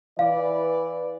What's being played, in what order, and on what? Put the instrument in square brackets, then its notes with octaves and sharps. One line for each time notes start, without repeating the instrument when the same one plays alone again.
[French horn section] E3 B4 D5 [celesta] F5